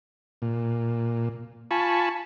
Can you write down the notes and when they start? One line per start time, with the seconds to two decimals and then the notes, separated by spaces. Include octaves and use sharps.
0.42 A#2
1.71 F4 G#5 A5 B5 C#6